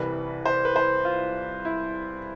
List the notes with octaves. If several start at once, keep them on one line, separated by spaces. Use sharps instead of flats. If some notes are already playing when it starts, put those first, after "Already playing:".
Already playing: C2 C3 E3 G3 B4
C5
B4
C5
F4
E4